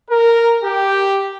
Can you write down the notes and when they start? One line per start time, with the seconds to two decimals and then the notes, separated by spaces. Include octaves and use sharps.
0.10 A#4
0.64 G4